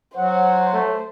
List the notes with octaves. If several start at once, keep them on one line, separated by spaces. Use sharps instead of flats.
F#3 C5 F#5
A3